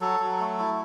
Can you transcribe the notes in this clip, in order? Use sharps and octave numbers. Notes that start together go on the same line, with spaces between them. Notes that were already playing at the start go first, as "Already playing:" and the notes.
F#3 A4
F#3
A3
E4